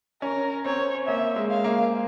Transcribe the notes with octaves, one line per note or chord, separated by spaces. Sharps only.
C#4 A#4
C4 C#5
A#3 E5
G#3
F5
A#3